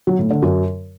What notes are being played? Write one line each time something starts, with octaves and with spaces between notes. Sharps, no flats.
F#3
A2
D3
F#2